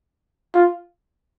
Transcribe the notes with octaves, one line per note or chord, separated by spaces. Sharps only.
F4